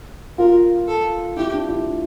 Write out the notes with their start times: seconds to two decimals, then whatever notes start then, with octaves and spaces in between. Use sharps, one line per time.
0.38 F4 A#4
0.88 A4
1.37 E4 G4
1.54 D4
1.69 E4